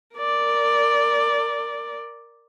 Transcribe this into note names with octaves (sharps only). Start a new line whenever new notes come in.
A#4 D5